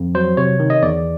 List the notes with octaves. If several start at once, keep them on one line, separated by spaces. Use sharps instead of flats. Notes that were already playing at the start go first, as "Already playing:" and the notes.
Already playing: F2
F#3 C5
C3 C#5
D#3
D#5
E2 D5